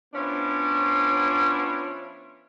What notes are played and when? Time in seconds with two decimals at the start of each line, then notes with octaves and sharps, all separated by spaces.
0.14 F3 B3 C#4 D4 E4 F4